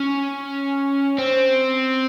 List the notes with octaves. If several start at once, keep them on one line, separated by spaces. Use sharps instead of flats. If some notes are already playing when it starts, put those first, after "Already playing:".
Already playing: C#4
C4